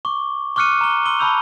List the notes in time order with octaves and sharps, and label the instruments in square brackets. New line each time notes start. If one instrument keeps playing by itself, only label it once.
[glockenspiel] C#6 D6
C#6 D6 F6 F#6 C#7 D#7
A#5 G7
C6 E6 D#7 G7
A5 B5 C#6 E6 G6 F7